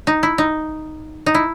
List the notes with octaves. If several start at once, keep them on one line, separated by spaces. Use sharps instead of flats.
D#4
E4
D#4
D#4
E4